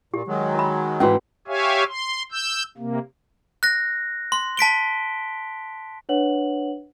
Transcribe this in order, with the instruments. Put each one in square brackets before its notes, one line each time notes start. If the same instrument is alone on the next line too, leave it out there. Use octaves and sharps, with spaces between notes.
[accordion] A#2 [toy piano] G4
[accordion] D#3 F#3 G#3
[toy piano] A#4 B5
[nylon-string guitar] G#2 E3 [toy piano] C#4 F#4
[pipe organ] G4 C#5 E5 F5 G#5
C6
E6 G6
C3 A#3
[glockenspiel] F#6 A#6
C6
A5 B6 D7 G7
[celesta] D4 B4 C#5 F#5 F#7